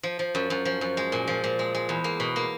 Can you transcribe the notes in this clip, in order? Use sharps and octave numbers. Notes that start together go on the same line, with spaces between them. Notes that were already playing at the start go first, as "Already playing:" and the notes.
F3
F3
F#2
F#2
F3
F#2
G#3
A#2
F3
A#2
G#3
G#3
E2
A#3
B2
A#3